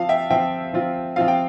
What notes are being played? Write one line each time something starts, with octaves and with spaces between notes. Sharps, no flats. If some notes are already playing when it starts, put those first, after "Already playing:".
Already playing: F3 C4 F4 F5 A5
E5 G5
F3 C4 F4 E5 G5
F3 C4 F4
F3 C4 F4 F5
G5